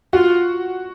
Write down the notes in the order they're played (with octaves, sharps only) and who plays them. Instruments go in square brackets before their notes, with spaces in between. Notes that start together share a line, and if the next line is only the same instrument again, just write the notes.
[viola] F4 [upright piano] F#4